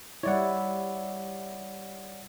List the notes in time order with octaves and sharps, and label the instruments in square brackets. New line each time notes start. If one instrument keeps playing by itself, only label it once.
[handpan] G3 E4 [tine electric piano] C#5 D5 F#5